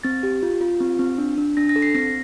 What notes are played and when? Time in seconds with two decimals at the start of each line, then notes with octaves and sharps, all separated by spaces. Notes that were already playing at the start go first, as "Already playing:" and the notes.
0.04 C4 A6
0.23 G4
0.43 F4
0.61 F4
0.81 C4
0.99 C4
1.18 D4
1.38 D4
1.57 D4 A#6
1.69 A#6
1.76 A4
1.82 C7
1.95 C4 A#6